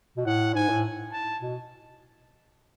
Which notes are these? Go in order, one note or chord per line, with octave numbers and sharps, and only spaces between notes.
B2
A2 F#5
G#2 G#5
A2
A5
B2